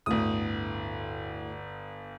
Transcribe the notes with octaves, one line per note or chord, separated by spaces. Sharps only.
G1 D2 A2 D#6